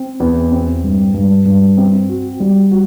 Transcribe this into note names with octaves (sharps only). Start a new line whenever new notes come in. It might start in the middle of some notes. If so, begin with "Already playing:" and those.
Already playing: C4
E2
C4
G2
G2
G2
C4
F#4
G3
F#4